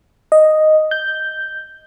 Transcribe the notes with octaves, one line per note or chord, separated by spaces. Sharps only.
D#5
G6